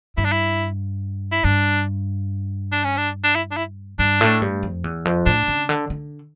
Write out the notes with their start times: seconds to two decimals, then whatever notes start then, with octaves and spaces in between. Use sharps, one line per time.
0.17 G2 E4
0.25 D4
0.32 E4
1.32 E4
1.44 G2 D4
2.72 D4
2.84 C#4
2.97 D4
3.24 D4
3.35 E4
3.51 D4
3.57 E4
3.99 G2 D4
4.21 A2
4.42 G2
4.63 F2
4.84 E2
5.05 F2
5.26 A2 D4
5.48 C#3
5.69 D3
5.90 D3